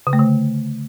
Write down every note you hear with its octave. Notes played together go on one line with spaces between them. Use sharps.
C#3
A3
D3